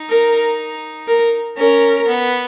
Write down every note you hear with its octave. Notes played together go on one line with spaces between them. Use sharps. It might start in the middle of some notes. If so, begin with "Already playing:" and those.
Already playing: D#4
A#4
A#4
C#4 A#4
B3